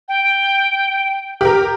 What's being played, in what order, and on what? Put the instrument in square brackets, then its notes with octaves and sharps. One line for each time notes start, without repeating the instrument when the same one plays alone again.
[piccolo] G5
[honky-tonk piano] G4 A#4